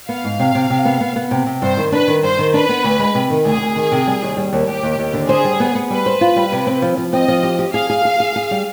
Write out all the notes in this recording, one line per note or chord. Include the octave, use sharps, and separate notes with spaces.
B3 F5
G#2
C3
C3
C3
B3
B3
B3
C3
C3
G2 C5
D#3
D4 B4
D#3
G2 C5
D#3
D4 B4
B3
D2
G#3
C3
D#3
D2 G#4
D2
D#3
C3
G3
D#2
G3
D#2
D#2 G4
D#2
D#2
D3
G#4 C5
G3
B3
B3
G3 B4
C5
F4
G3
C3
C4
F3
F3
C4 D#5
F3
G4
G4
G#4 F5
G#4
G#4
G#4
G#4
G3